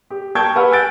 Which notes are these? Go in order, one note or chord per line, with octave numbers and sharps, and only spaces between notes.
G4
A#4 G5 A5 C#6 G6 G#6
G4 A#4 B4 F#5 E6 F6
G#5 E6 F#6 G6 A6 D7